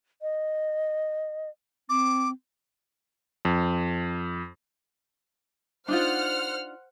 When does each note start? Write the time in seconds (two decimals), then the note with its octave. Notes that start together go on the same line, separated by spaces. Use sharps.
0.22 D#5
1.89 C4 D6
3.45 F2
5.88 D4 D#4 F4 C5 F#5 F6